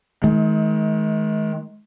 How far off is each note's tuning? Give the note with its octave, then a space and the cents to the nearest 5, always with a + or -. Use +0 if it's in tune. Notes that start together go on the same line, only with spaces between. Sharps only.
D#3 +30 G#3 +40